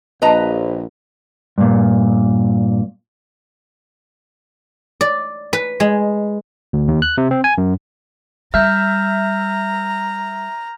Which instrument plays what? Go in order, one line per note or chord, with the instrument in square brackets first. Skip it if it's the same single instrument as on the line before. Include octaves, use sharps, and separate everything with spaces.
[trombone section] A#1 [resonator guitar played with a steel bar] B4 D#5 A#5
[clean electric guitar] G2 A#2
[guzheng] D5
B4
G#3
[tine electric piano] D2
D#2
F#6
C3
C4
G#5
F#2
[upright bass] G3 [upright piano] E5 [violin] A#5 [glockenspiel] F6 G6